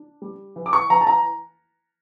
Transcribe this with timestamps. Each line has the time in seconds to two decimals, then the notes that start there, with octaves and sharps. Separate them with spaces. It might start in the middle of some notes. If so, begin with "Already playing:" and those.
Already playing: D4
0.22 G3
0.56 E3
0.66 D6
0.73 C#6
0.90 E3 A#5
1.01 A5
1.07 A#5